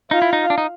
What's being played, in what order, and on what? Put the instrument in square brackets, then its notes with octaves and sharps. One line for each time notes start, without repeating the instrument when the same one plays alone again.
[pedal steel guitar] D#4 [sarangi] F4
[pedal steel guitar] E4
D#4
D4
D#4